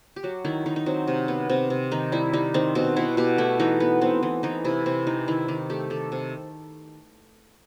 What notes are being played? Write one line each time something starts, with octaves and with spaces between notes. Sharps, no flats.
G4
F#3 F#4
D#3 E4
D#3 D#4
D#4
F#3 C4
C3
B3
C3 C4
C3
D#3 D#4
G3 E4
G3 D#4
D#3 C4
B2 C4
B2 E4
B2 G4
A3 E4
E3 D#4
B3
B3 C4
E3
E3 D#4
C3 E4
C3 C4
E3 D#4
D#3 E4
D#3 G4
A3 G4
D#3 A4
C3